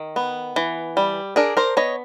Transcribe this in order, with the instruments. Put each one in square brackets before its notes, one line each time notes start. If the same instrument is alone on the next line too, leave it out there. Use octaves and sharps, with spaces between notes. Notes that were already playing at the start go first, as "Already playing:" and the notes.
Already playing: [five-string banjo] D#3
B3
E3
G3
D4 G#4 A#4
A#4 C5
B3 C#5 D#5